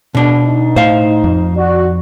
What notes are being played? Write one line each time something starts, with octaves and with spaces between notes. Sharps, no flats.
B2 D4
D#4
A2 C5 F5
F2
F#4 D5